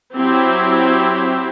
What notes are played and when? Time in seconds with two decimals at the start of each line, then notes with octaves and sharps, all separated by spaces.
0.15 F#3 C4 E4 G4